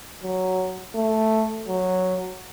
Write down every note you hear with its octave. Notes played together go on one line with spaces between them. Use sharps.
F#3
A3
F#3